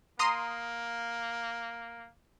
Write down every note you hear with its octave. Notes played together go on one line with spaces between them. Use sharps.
A#3 A#5 C6 D#6